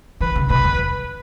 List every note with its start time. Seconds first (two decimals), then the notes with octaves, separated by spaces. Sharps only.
0.21 E3 B4
0.36 C#3
0.50 B2 B4
0.64 E2